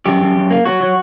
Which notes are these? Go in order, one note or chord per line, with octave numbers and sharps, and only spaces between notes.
F#2 G4
F#2
F#2
A#3
F#3 F#4
F#3